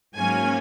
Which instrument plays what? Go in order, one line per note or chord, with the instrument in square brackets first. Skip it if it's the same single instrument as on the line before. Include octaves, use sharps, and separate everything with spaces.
[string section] G#2 F#3 A#3 C#4 G#5